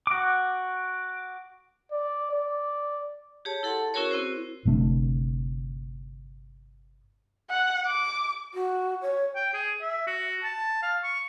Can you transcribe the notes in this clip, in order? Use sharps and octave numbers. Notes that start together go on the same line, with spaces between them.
F#4 D6
D5
D5
G4 G#4 C#5 A5
E4 A4 F#5 A5 C6
C#4 E4 F#4 G#4 A#4 C#5
C4 E4 F#4 C5
G1 C3 A3 D4
F#5
D6
F#4
C#5
G5
G#4
E5
F#4
A5
F5
C#6